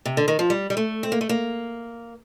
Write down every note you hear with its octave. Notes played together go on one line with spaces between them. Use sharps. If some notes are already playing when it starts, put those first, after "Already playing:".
C3
D3
D#3
F3
G3
G3
A3
C4
A#3
A3
A#3